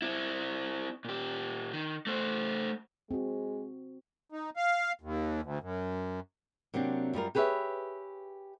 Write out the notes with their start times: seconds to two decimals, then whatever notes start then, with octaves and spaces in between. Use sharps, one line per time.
0.02 C4 E4
1.05 A#2 G4
1.73 D#3
2.07 A3 C5
3.11 G#3 C4 F#4
4.32 D#4
4.56 F5
5.01 D#2
5.43 D2
5.61 F#2
6.74 C3 F#3 A#3 C4 D4
7.14 F#2 G3 F4 A#4
7.35 G4 G#4 B4 C#5 E5